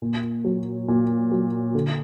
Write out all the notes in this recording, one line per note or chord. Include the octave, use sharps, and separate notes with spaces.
A#2
F#3
A#2
F#3
D3